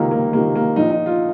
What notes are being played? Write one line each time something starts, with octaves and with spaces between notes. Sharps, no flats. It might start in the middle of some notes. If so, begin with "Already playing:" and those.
Already playing: C#2 C3 D#3 A#3
A#3
C#2 C3 D#3 A#3
A#3
A#1 A#2 D#4
D#4
F4